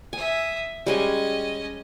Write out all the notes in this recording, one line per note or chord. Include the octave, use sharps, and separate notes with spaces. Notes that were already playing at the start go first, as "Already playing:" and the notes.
E5 G#5 D#6
G3 G#3 C#4 D#5 G#5